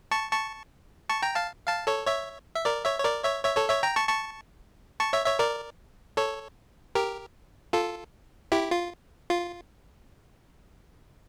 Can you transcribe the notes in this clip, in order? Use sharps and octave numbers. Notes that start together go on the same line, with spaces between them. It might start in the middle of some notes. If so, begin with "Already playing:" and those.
A5 C#6
A5 C#6
A5 C#6
G5 A#5
F5 A5
F5 A5
A4 C#5
C#5 E5
E5
A#4 D5
C#5 E5
C#5
A#4 D5
C#5 E5
C#5 E5
A4 C#5
C#5 E5
G5 A#5
A5 C#6
A5 C#6
A5 C#6
C#5 E5
C#5 E5
A#4 D5
A4 C#5
G4 A#4
F4 A4
E4 G4
F4
F4